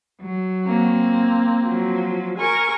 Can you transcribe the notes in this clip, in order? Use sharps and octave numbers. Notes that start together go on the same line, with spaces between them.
F#3
A#3 C4
F3 F#3
A#4 G#5 C#6